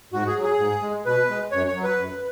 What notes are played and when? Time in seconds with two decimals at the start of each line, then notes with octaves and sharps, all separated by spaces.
0.13 G#2 F#4
0.27 G#4
0.36 F#3
0.43 G#4
0.59 G#2
0.82 G#3
1.06 B2 B4
1.30 G#3
1.52 F#2 C#5
1.68 C#5
1.75 F#3
1.84 B4
1.99 F#2